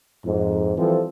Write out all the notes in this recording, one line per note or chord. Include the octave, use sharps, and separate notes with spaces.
F2 G#2
E3 F3 G3 C4 F4 A4